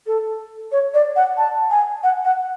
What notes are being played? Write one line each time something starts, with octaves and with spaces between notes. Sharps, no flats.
A4
C#5
D5
F#5
A5
G#5
F#5
F#5